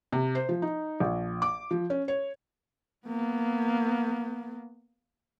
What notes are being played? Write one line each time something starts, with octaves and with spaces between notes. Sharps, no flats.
C3
C5
F3
D#4
A#1
D6
F3
C#4
C#5
A#3 B3